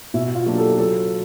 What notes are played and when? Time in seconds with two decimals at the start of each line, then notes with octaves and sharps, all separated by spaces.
0.14 B2 E4
0.35 F4
0.46 F#3 A#3 D4 G4
0.58 A4
0.78 F#3 A4